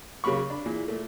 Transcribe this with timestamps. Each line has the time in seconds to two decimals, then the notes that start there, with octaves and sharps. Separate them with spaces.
0.24 C#3 F#3 A#3 B5 C#6
0.50 D4 B5
0.66 A#2 E3 G#4
0.88 A#2 A3